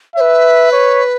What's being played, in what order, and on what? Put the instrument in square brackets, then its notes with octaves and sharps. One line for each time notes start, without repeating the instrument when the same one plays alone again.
[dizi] C#5 [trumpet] E5
[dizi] B4
[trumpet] C#5